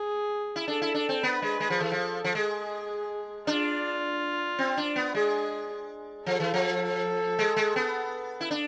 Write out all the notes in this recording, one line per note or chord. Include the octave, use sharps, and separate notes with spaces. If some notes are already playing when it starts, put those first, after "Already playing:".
Already playing: G#4
E4
D4 A4
E4
D4
C4
B3 B4
G#3
G#3
F3
E3 A4
F3
F3
G#3 G#4
D4 F4
C4
D4
B3
G#3 G#4
F3 A4
E3
F3
G#3
G#3
B3
E4
D4